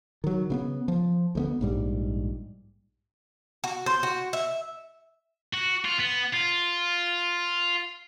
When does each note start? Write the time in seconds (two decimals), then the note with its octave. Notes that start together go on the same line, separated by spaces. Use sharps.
0.24 D#3 F#3
0.50 C#3 A#3 B3
0.88 F3
1.35 D2 G#3 B3
1.61 A#1 G#2 G3
3.64 F#4
3.86 C5
4.03 F#4
4.33 E5
5.54 F#4
5.85 F4
5.99 B3
6.34 F4